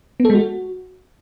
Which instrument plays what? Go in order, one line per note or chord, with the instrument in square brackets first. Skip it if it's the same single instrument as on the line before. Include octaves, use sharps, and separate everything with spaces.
[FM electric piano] B3
A4
G#3
F#4